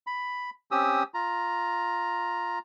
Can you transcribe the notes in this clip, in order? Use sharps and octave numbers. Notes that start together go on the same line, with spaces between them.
B5
C4 C#4 G4 D#6 E6
F4 A#5